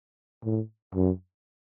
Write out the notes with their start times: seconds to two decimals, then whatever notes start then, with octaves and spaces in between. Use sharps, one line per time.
0.45 A2
0.95 F#2